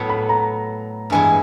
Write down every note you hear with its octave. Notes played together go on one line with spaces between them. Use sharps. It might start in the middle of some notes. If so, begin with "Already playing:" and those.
Already playing: A2 F#3 B3
B5
A#5
G2 E3 G#3 B3 G#5